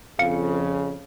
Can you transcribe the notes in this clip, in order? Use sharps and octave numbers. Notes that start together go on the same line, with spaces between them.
F2 C#3 F5 C#7